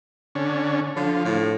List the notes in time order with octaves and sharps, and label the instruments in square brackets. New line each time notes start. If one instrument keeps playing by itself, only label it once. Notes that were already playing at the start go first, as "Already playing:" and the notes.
[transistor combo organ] D3 C#4
[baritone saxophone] D3 [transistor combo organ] F3
[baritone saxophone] A2